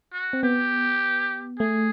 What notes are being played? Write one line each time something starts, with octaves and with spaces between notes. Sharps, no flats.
F#4
C4
B3 G4
A3 G#4